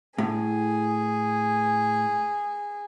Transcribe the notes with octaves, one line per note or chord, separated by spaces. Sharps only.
A2 G#4